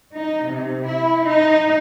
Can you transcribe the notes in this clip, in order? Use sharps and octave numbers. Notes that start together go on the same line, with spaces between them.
D#4
C3
E4
D#4